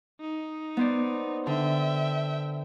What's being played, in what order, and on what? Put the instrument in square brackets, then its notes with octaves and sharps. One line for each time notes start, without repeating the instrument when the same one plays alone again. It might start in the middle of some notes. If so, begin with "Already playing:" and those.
[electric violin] D#4
[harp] B3 C5 D5
[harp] D3 [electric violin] E5 G5